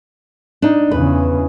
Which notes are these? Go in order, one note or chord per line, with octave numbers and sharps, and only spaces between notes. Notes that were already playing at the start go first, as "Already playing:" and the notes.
D4 D#4
E2 C#3 B4